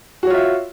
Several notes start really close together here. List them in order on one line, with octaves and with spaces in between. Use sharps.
F#4 C#5 F4 E5